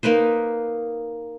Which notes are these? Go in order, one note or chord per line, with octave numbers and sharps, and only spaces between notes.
A#3 D#4 B4 C5